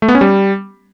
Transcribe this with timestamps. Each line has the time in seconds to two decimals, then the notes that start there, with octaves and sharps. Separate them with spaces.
0.02 A3
0.08 B3
0.15 C#4
0.21 G3